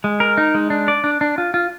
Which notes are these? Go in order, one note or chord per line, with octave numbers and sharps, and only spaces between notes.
G#3
A#4
D#4
G#3
D4
D5
D4
D4
F4
F4